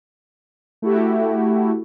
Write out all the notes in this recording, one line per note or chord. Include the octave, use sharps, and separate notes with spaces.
A3 E4 F#4 G4